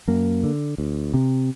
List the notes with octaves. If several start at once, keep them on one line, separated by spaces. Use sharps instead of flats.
F#2 A#3
D3
D2
C3